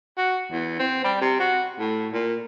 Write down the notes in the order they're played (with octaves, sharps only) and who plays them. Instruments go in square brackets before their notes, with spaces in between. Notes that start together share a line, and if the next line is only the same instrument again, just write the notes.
[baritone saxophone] F#4
E2
C4
G3
C3
F#4
A2
A#2